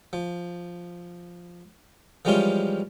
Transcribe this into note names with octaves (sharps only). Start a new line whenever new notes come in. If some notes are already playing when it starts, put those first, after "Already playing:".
F3
E3 F3 G3 G#3 C#4 F4